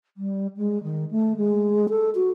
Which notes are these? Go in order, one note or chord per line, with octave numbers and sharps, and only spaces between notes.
G3
G#3
D#3
A3
G#3
A4
F#4